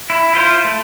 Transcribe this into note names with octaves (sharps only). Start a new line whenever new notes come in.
E4
E4 F4 C5
A3